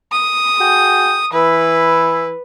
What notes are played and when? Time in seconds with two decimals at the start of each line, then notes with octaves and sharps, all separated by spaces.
0.12 D#6
0.59 F#4 G#4 G5
1.33 E3 E4 B4